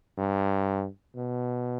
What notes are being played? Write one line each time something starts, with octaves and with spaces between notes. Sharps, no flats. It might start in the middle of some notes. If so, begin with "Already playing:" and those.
G2
B2